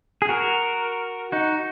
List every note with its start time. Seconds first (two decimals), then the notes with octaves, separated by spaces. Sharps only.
0.22 G#4
0.29 F#4 A#4
1.32 D#4 F#4